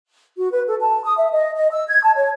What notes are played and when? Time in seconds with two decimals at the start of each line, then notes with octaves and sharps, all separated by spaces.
0.37 F#4
0.52 B4
0.67 A4
0.80 A5
1.04 D#6
1.17 E5
1.31 D#5
1.55 D#5
1.71 E6
1.88 G#6
2.03 A5
2.16 C#5